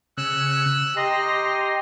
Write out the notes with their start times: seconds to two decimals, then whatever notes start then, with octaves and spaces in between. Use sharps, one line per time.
0.17 C#3 E6 F#6
0.97 G4 D#5 A#5 C6